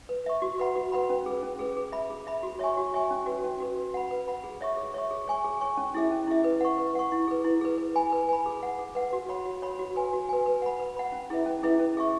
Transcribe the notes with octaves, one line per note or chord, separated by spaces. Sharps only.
B4
E5 C#6
F#4
B4 F#5 B5
F#4
B4 F#5 B5
C#4
G#4 B4
C#4
G#4 B4
G#4
E5 B5
G#4
E5 B5
F#4
C#5 E5 G#5 C#6
F#4
C#5 E5 G#5 C#6
C#4
F#4 B4
C#4
F#4 B4
B4
F#5 B5
B4
F#5 B5
G#4
C#5 E5 C#6
G#4
C#5 E5 C#6
G#4
C#5 G#5 C#6
G#4
C#5 G#5 C#6
C#4
E4 G#4 E5
C#4
E4 G#4 E5
B4
F#5 C#6
B4
F#5 C#6
E4
G#4 B4
E4
G#4 B4
B4
G#5 B5
B4
G#5 B5
G#4
B4 F#5
G#4
B4 F#5
F#4
C#5 F#5 B5
F#4
C#5 F#5 B5
F#4
B4 G#5
F#4
B4 G#5
B4
F#5 B5
B4
F#5 B5
C#4
E4 G#4 B4 E5
C#4
E4 G#4 B4 E5
C#4
G#4 E5 C#6